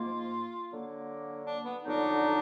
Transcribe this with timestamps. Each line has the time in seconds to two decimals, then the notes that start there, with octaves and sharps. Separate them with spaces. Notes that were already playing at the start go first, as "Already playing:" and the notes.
Already playing: G#2 F3 A#3 F4
0.70 D3 F#3 A#3
1.45 D4
1.64 B3
1.83 F2 D3 F#3 B3 D4 D#4